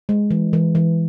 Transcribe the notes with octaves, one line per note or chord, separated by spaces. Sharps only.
G#3
E3
E3
E3